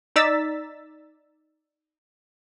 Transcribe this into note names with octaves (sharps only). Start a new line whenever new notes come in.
D#4 D5 A#5 E6 A6 B6